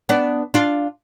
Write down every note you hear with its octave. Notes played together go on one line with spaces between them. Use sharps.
B3 D4
D4 F4